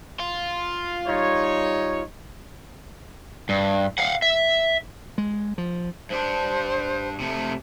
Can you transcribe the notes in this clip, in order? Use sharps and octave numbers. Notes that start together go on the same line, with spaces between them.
F4
G3 D#4 C#5
G2
F5 F#5
E5
G#3
F3
G2 D4 C5
C3 A3